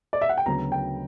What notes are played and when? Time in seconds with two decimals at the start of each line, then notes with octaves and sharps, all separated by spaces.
0.13 D5
0.21 E5
0.29 F#5
0.37 G5
0.46 D2 C#3 F#3 B3 A#5
0.72 G5